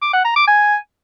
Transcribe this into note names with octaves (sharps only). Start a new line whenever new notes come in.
D6
F#5
A#5
D6
G#5